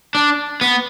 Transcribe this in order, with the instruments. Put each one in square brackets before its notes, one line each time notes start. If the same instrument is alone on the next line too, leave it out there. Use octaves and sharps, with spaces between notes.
[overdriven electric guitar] D4
B3